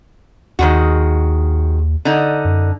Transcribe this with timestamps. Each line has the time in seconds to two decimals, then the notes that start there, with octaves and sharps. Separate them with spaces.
0.59 D#2 D#3 G#3 F#4
2.05 D3 D#4
2.45 F#2